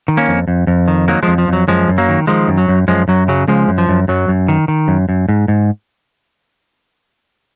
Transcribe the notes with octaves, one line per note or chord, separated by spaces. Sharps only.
D#3
A#3 C#4
F2
F2
F2
D#3
D#3 F#3 A#3
F3 G#3
F2
F3
F2 F#3
F#2 F3 G#3
F#2
F#3 A#3
D#3
D#3 F3 G#3
F#2
F#3
F#2
F#2 F3 G#3
F#2 F#3
C#3 F#3
C#3 F3 G#3
F#2
F3
F#2
F#2 F#3
F#2
D#3
D#3
F#2
F#2
G#2
G#2